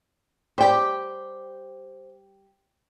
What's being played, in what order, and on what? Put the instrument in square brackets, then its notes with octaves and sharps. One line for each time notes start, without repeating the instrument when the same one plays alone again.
[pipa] G3 G4 [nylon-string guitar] C5 G5